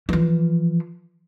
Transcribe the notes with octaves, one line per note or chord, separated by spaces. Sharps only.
E3 F3